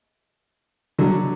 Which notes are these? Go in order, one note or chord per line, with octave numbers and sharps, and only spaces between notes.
D3 F#3